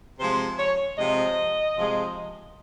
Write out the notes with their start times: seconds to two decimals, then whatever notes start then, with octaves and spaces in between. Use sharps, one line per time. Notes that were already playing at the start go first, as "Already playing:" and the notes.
0.20 C3 F3 G#3 C5
0.58 C#5
0.98 C3 F3 G#3 D#5
1.75 C3 F3 G#3